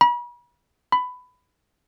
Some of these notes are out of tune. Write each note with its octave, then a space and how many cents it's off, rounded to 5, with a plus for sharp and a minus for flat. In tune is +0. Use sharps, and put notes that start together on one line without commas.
B5 -40
B5 +15